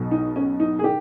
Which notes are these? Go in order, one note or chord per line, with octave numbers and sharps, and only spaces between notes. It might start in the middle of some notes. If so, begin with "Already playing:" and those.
Already playing: B1 B2
D#4
C#4
D#4
G#4
D#3 G4